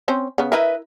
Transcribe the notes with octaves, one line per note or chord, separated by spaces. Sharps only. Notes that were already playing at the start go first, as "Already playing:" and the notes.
C4 C#4 C5
C#3 B3
E4 A#4 B4 D#5 E5